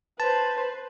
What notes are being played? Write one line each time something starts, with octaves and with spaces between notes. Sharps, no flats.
B4 C5 A5